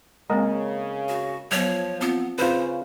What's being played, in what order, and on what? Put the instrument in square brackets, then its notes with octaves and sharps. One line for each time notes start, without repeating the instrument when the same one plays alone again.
[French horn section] C#3 [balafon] G#3 A#3 C4 [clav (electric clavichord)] A#4 D#5
[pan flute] F#4
[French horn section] F3 [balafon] F#3 B3 [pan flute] C#5
[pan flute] B3 [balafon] C4 F4
[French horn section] C#3 [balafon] C4 [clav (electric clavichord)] F4 B4 [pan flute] C5